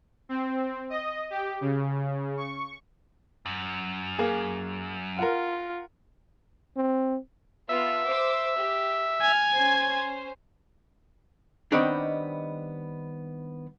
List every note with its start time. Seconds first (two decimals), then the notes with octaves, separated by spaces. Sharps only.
0.29 C4
0.90 D#5
1.30 G4
1.61 C#3
2.37 C#6
3.46 F#2
4.19 A#3 G#4
5.19 F4 A#4 F#5
6.77 C4
7.69 B3 F4 E5 A5
8.06 C5 D6 E6
8.57 G4
9.21 G#5 F6 G#6
9.55 C#4 C5
11.72 D#3 G3 B3 C4 D4 D#4